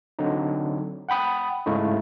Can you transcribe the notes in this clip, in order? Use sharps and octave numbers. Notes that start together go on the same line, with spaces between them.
D3 F#3 C4 D#4
F#5 G5 B5 D#6
G#2 C#3 G#3 A3 D#4 E4